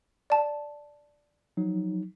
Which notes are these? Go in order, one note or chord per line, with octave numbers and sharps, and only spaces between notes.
D5 A5
F3 F#3 D#4